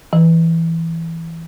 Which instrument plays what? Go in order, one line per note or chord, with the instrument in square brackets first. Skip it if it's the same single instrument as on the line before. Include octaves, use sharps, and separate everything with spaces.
[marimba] E3